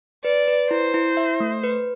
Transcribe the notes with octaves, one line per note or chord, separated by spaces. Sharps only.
B4 D5
B4
E4 C5
E4
E5
A3
B4